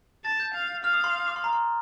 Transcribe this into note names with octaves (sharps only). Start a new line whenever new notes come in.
A5 A6
G6
F5
F5 F6
D#6
C6
D6
C6
A#5
C6